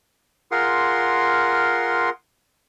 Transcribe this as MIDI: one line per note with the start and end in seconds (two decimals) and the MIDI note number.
0.51 2.10 65
0.51 2.10 68
0.51 2.10 70
0.51 2.10 78
0.51 2.10 84